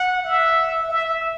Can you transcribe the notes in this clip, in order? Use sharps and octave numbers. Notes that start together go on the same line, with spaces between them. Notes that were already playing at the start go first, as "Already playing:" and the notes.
Already playing: F#5
E5
E5